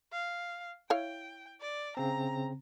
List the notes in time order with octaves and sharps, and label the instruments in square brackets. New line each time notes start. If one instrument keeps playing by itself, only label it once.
[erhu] F5
[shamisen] E4 C#5 F5 [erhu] G5
[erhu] D5
[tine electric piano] C#3 C4 [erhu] A#5